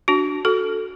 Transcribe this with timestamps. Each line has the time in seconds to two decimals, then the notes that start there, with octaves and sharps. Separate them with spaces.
0.08 D4 F#4
0.45 F#4 A4